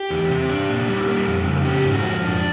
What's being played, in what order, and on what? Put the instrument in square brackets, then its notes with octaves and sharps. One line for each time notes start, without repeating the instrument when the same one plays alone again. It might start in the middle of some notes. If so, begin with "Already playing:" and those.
Already playing: [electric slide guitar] G4
E2
C3
D4
A#2
G3
A#3
F2
C#3
C#4 G4
G#2
F#4
F3
F2 D4